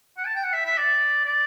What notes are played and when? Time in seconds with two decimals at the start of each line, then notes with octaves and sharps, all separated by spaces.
0.18 F#5
0.26 A5
0.36 G5
0.44 F#5
0.53 E5
0.65 E5
0.78 D5
1.25 D5